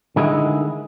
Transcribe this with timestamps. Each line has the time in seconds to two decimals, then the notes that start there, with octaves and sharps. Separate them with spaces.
0.16 D3 D#3 G#3 E4